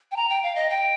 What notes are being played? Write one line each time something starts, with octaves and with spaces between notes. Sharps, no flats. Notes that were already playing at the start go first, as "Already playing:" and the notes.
G5
A#5
G5
F5
D#5
G5